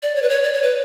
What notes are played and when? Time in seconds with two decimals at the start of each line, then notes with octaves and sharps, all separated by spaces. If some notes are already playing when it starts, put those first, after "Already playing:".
0.03 D5
0.15 C#5
0.22 B4
0.29 C#5
0.43 D5
0.53 C#5
0.62 B4